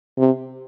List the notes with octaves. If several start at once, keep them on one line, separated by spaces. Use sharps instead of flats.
C3